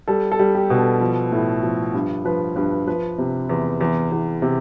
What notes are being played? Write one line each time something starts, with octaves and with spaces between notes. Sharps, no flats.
G3 A4
A4
G3
G4
B2
A4
F3
A2
F3
G2
F3 B4
G2 B4
F3 B4
C3
E2
E2
E2
C3